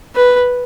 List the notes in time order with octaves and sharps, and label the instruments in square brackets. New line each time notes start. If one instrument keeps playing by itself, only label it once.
[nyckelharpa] B4